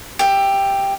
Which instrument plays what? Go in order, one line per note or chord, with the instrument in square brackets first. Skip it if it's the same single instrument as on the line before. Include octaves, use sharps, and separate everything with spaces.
[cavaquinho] G4 E5